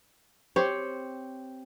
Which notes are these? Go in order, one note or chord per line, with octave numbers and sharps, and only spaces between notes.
C4 G4 C5 C#5